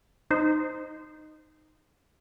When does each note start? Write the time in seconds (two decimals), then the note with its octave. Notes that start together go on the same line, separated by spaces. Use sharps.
0.30 D#4 C5